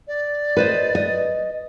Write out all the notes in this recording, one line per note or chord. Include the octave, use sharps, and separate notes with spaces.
D5
B4 C5 D#5
D#5